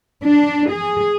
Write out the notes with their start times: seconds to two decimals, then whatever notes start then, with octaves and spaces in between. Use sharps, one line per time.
0.23 D4
0.72 G#4